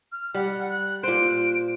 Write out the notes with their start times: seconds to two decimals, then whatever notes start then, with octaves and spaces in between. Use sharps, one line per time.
0.12 F6
0.35 G3 F#5
0.69 F#6
1.03 A#2 C5 D7